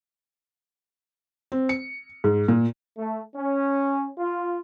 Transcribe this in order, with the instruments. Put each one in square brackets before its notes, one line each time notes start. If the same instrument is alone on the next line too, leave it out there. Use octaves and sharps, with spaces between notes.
[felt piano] C4
C#7
G#2
A#2
[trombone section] A3
C#4
F4